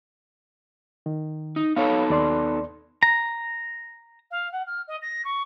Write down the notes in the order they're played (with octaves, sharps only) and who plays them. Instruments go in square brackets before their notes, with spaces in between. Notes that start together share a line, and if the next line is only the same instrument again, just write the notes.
[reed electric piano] D#3
[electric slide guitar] D#4
[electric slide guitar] B3 D#4 A4 [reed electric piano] C#5 F5
[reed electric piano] D#2 D5 C6
[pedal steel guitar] A#5
[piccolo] F5
F#5
F6
D#5
A#6
C#6